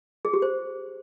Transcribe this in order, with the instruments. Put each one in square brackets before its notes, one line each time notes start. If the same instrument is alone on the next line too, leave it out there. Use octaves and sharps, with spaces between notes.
[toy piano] G#4
G4
C5